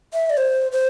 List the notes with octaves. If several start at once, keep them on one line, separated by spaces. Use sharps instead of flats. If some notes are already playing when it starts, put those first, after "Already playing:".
E5
D5
C5
C5